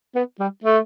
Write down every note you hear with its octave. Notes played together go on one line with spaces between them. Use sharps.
B3
G3
A3